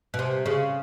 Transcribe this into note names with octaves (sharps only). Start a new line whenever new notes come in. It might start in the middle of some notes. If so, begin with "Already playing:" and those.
B2
C3
C#3